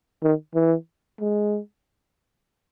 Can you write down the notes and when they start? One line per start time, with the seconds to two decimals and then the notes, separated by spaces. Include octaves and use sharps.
0.23 D#3
0.55 E3
1.20 G#3